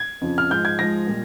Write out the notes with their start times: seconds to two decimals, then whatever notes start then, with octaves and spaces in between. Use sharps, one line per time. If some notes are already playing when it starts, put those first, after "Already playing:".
Already playing: G#6
0.21 F2 C#3 F3
0.38 F6
0.50 G#2 F3 G#3 G6
0.65 G#6
0.79 G#2 F3 G#3 A#6
1.07 A#2 G3